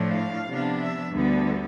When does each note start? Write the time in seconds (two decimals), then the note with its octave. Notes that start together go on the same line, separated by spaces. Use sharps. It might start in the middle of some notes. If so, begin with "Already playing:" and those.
Already playing: A2 F3 A3 D4
0.12 F5
0.45 C3 F3 B3 D4
0.79 E5
1.12 D2 D3 G3 B3